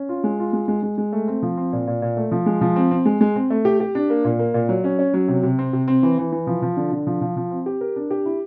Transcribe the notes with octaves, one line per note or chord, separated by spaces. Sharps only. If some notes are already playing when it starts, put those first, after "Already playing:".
Already playing: C#4
F4
G#3
F4
G#3
G#3
G#3
G#3
A3
C4
F3
C4
A#2
A#2
A#2
A3
F3
G#3
F3
C4
C4
G#3
G#3
C4
A3
G4
G4
D4
A#3
A#2
A#3
A#2
F#3
C#4
C#4
F#3
C3
C3
C4
C3
C4
E3
E3
E3
F3
F3
D3
D3
F3
F3
F3
C4
G4
A#4
D4
G4
E4